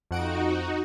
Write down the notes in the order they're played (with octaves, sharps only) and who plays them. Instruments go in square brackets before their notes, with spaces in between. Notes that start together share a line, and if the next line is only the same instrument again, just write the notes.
[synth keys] F2 F#5 D7 [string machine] D#4 F#4